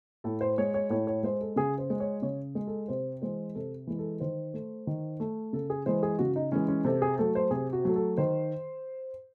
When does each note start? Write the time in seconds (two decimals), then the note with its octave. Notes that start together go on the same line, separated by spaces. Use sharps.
0.24 A2 A4
0.41 C5
0.58 G#3 C#5
0.74 C#5
0.90 A2 C#5
1.07 C#5
1.23 G#3 C5
1.41 A4
1.56 C#3 G#4
1.78 C5
1.90 G#3
2.00 C#5
2.22 C#3 C#5
2.55 G#3
2.67 A4
2.88 C3 C5
3.22 E3 G#3 C5
3.55 C3 A4
3.87 E3 G#3
3.99 A4
4.20 D#3 C5
4.54 A3
4.87 D#3
5.20 A3
5.53 C#3 A4
5.70 G#4
5.86 E3 G#3 C5
6.03 G#4
6.19 C#3 F#4
6.36 D#4
6.52 E3 G#3 C#4
6.68 C#4
6.85 C3 A4
7.02 G#4
7.19 F#3 A3 A4
7.35 C5
7.51 C3 G#4
7.73 F#4
7.85 F#3 A3
7.96 A4
8.17 D#3 C5